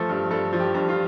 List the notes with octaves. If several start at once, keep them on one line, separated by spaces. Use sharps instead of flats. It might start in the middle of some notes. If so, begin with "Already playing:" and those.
Already playing: F3 A3 A4
G2
G2 A4
F3
G4
G2
F4